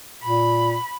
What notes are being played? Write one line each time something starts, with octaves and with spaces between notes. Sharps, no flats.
A#2 B5